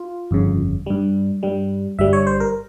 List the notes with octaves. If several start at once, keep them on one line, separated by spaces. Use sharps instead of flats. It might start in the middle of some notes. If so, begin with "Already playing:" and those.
Already playing: F4
G1 F2 C#3
G2 G3
G2 G3
G1 G2 G3 E5
C#5
C5
A#4